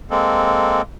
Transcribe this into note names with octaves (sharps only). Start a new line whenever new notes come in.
G#3 A#3 C4 A4